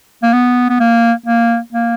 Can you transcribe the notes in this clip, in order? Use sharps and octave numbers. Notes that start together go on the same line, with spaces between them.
A#3
B3
B3
A#3
A#3
A#3